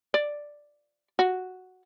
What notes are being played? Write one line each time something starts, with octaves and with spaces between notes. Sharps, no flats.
D5
F#4